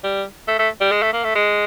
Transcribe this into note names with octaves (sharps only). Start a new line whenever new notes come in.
G3
A3
A3
G3
G#3
A3
A#3
A3
G#3